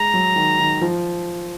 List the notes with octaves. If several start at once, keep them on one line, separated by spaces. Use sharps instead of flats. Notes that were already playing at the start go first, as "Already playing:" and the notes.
Already playing: G#3 A#5
F#3
D#3
D#3
F3